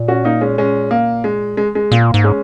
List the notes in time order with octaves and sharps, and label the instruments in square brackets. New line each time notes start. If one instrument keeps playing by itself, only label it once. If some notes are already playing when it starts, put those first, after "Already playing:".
Already playing: [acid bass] A#2
[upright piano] C#4 F#4
A#3 D#4
G#3 C#4
G#3 C#4
A#3
G#3
G#3
G#3
[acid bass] A#2 [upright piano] A#3
[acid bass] G#2
[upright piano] G#3 C#4